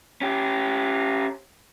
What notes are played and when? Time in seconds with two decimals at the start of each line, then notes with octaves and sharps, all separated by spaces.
0.21 C#4 G4